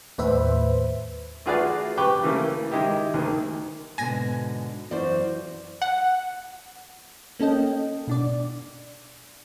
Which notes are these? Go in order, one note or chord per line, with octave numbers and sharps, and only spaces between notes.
D#2 A2 B4 C5 E5 B5
A3 F4 F#4 G#4 B4 D5
G4 B4 G5 C#6 D6
C#3 E3 A3 A#3
D#3 G#3 E4 G4
D2 D#3 A#3
G#2 B2 D3 G#5 G#6 A#6
F#2 E3 F#4 C5 D5
F#5
A#3 C#4 A4 D#5 G5
B2 D4 D5